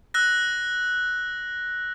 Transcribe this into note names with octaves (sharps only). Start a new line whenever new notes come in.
E6 F#6 A#6